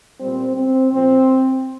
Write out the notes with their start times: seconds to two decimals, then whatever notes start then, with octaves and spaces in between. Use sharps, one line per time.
0.20 A#2 G3 C4
0.55 C4
0.91 A#2 F3 C4